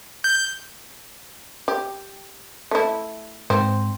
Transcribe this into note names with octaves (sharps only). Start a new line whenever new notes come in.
G6
G4
A3 E4
G#2 C4